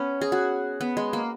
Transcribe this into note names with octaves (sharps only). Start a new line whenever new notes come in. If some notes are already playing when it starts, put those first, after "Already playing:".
Already playing: B3 C#4
G#4
F#4
B3
G#3
A#3